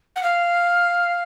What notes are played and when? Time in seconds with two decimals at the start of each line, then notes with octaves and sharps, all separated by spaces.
0.15 F#5
0.23 F5